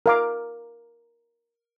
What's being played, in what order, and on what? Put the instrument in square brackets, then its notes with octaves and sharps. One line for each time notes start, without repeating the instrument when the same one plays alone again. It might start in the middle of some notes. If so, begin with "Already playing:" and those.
[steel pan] A#4 F5 D6